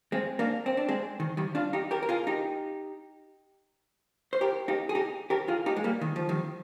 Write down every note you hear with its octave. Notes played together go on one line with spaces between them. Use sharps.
G#3 C4
A#3 D4
C4
D4
G#3 C4
D#3
D#3 G3
D4 F4
D#4 G4
G4 A#4
A#4
F4 G#4
D#4 G4
C5
G4 A#4
D#4 G4
G#4
D#4 G4
G4 A#4
F4 G#4
D#4 G4
G#3
G3 A#3
D#3
F3
D#3 G3